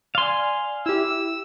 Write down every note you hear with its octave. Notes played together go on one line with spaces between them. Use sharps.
D5 F5 G#5 C6
E4 G4 E6